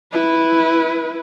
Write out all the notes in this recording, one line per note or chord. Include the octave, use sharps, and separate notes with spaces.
E4 B4